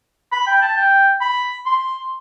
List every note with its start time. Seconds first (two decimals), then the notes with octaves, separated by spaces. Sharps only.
0.32 B5
0.47 G5
0.62 A5
0.76 G5
1.21 B5
1.66 C6